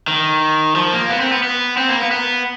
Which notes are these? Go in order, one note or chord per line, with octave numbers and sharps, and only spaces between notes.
D#3
F3
A#3
B3
C4
B3
B3
C4
A#3
B3
B3